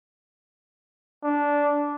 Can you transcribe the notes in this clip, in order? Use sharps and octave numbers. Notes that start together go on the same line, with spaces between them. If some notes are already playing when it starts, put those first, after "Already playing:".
D4